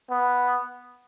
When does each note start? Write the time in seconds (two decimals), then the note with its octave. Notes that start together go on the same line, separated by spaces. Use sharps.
0.11 B3